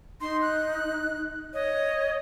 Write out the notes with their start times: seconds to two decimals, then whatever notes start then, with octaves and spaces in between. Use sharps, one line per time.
0.21 D#4 C6
0.42 F#6
1.54 C#5 D#5